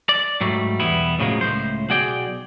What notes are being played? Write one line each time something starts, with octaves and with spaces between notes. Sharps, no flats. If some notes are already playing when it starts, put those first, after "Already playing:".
D5
G#2 F#3 G3 A3
B1 E2 G3 B3 E4
A2 C#3 F3 F#3 G#3 A#3
C#2 A2 C5
B1 F#4 G#4 D5 G5